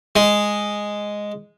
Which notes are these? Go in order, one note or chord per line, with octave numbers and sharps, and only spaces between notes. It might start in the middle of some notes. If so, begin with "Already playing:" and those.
G#3